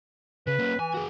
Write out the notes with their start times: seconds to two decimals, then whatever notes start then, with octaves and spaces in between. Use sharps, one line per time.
0.47 C#3 B4
0.59 A#3 C#4
0.79 E3 G#5
0.94 F#4 G#4